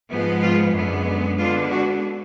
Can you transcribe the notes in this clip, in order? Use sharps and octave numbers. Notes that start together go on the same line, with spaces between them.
G#2 F3 G#3 B3
F4
F#2 D3 G#3 B3
D3 G#3 B3 D4 F4
F#4